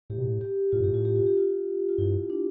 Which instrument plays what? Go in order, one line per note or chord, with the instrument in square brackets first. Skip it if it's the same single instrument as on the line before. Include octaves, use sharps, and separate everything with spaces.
[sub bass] A2 [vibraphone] G4
[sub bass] B2
A2
[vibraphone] G4
[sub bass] A2 [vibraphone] F4
[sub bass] G2
[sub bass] A2 [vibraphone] G4
[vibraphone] F4
G4
F4
G4
F4
F4
[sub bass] G2 [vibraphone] E4
[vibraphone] D4